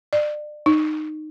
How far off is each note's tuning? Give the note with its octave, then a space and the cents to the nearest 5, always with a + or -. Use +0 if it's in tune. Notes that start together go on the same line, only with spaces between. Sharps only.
D5 +30
D#4 -15